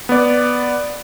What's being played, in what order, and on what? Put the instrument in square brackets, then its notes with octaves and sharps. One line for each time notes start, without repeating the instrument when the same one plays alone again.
[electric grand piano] B3 D5